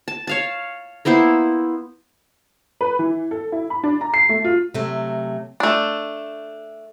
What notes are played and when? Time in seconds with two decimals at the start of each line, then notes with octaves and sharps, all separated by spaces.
0.08 A5
0.27 C#5 F5 A5
1.05 A#3 B3 E4 C5
2.81 B4
2.99 E3
3.31 A4
3.52 E4
3.70 B5
3.84 D4
4.01 A#5
4.14 C7
4.29 A3
4.44 F4
4.74 C3 F#3 A3
5.60 A3 D4